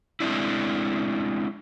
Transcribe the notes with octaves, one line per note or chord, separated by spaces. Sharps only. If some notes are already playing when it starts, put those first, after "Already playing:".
G#3 A3 C4 D4 E4